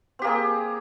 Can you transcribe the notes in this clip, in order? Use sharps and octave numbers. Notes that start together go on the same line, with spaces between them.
A#3 C4 G4 G#4